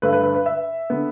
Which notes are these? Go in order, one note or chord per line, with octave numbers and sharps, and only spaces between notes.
G2 D3 A3 B4
B4
B4
B4
E5
D3 B3